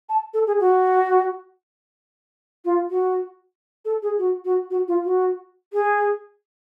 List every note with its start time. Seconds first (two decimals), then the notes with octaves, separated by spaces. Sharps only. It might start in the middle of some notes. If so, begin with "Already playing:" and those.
0.09 A5
0.34 A4
0.47 G#4
0.60 F#4
2.65 F4
2.90 F#4
3.85 A4
4.03 G#4
4.19 F#4
4.45 F#4
4.71 F#4
4.88 F4
5.04 F#4
5.73 G#4